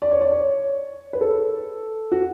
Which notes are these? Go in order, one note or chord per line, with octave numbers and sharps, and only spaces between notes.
D5
C#5
D5
C#5
B4
A4
F#4